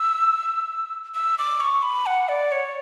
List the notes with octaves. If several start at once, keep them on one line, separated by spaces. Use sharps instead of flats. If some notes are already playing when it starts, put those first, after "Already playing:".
Already playing: E6
E6
D6
C#6
B5
F#5
D5
C#5